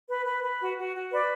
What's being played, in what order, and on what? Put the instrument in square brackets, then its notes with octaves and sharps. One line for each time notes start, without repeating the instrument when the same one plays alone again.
[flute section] B4
B4
B4
F#4
F#4
F#4
B4 D5